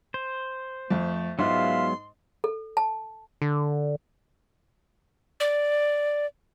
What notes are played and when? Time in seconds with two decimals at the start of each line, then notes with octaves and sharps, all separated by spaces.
0.14 C5
0.90 F2 A3
1.39 G#2 F#3 G#3 B3 F4 E5 F5 C6
2.44 A4
2.77 A5
3.42 D3
5.40 D5